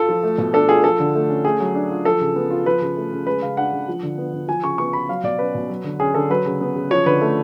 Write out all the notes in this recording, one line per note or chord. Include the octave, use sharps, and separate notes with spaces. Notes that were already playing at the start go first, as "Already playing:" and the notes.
Already playing: F4 A4
F3
A3
B2
D4 A4
F4 G#4
F3 A4
D3
A3
C#4
A3 G#4
F#3
D4
F4
F3 A4
C#3
B3
F4
F3 B4
C#3
A3
C#3
G#3 B4
C#3 F5
D4 F#5
C#3
F3
D3
B3
D3
F3 G#5
C#3 C#6
B3 C#6
F4 B5
F#3 F5
B2 D5
C#4 B4
B2
F#3
D3
C#4 G#4
D3 A4
F#3 B4
C#3
B3
C#3
F3 C#5
D3 B4
A3